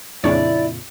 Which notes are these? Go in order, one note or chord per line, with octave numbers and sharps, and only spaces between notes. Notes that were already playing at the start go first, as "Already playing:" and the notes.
F2 A#2 C#3 D4 E4 C#5 D5